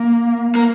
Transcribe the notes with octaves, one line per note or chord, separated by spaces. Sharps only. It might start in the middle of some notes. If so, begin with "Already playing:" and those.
Already playing: A#3
A#3